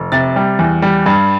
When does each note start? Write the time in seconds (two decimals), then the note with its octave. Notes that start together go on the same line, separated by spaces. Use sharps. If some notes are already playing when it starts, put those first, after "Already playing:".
Already playing: F1
0.12 C3 A6
0.36 G3
0.59 E2
0.82 G3
1.06 G2